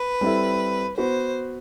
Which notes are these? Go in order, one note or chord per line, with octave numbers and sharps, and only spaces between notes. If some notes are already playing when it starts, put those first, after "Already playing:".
Already playing: B4
G3 C4 E4 A4
B3 F#4 B4 C5